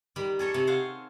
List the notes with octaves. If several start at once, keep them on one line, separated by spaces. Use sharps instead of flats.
D#3 G3 B5
G#4 A4 C#5 D#5
C3
C5 C#5 F5 F#5